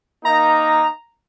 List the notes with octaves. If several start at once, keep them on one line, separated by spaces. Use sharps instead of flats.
A#3 D#4 A#5